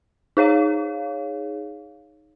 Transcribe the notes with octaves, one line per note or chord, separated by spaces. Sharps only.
D#4 G#4 C#5 F5